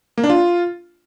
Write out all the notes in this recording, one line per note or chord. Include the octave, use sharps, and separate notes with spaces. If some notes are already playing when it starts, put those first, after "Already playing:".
A#3
D4
F4